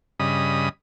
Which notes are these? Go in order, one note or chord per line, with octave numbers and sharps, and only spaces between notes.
G2 C#3 D#5 B5 D#6